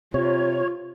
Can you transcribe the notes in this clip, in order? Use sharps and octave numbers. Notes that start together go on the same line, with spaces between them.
C3 F4 C#5